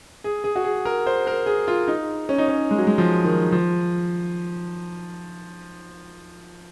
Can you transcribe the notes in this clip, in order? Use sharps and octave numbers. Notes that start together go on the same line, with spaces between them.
G#4
G#4
F#4
G#4
A#4
C5
A#4
G#4
F4
D#4
C#4
D#4
C#4
G#3
F#3
G#3
F3
D#3
F3